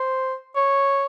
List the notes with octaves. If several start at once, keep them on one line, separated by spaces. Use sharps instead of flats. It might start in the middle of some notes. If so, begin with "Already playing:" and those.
Already playing: C5
C#5